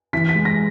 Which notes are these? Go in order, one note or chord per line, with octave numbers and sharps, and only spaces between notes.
E3 B6
B6
G#3
A#6